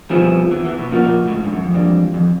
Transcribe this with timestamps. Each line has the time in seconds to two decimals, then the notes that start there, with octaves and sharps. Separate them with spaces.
0.10 F2 B2 F3 G3 B3 E4 G#4
0.51 E2 E3
0.64 E2 E3
0.78 B2
0.91 A#2 C#3 F3 A#3 D#4 F#4
1.05 A#2
1.28 A2
1.32 G#2
1.43 G2
1.53 F#2
1.63 F2
1.73 G#2 E3 G3 A#3 D4
2.14 F2